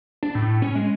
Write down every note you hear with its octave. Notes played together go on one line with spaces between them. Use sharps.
D4
A2
C#4
G#3